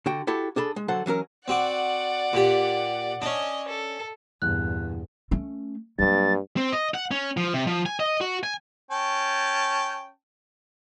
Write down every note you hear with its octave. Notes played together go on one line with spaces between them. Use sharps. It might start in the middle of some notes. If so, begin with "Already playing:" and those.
D3 F#4 G5
E4 F#4 G4 A4
D4 G#4 A4 B5
G#3
D3 F#3 A4 C5 F#5
E3 F#3 C#4 A#4
C4 F#4 D5 F#5 D6
A#2 G4
C#4 D4 D#5
A4
E2 G2 A#2 F#6
A3 C#4
G2 F#3 A#3 A6
C4
D#5
F#5
C#4
F3
C3
F3
G#5
D#5
F#4
G#5
C#4 G5 A5